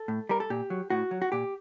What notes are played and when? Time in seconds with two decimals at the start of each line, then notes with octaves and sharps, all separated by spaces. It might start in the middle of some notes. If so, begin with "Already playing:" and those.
Already playing: A4
0.08 A2
0.29 G3 A#4
0.40 A4
0.50 A#2 G4
0.70 F#3
0.90 A2 F#4
1.11 F#3
1.22 F#4
1.32 A#2 G4